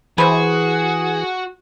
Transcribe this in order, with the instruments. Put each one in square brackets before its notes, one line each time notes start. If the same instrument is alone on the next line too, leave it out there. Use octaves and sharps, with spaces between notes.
[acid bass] E3 [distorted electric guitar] F#4 [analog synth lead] G#4 [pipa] B4 C5